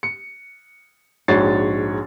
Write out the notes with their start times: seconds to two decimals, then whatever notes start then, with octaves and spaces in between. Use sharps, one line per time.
0.03 C#7
1.28 A#1 G#2 F#4 C#5 A6 C7